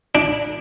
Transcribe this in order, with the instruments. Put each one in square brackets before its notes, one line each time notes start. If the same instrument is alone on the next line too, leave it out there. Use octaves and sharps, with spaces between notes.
[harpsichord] D4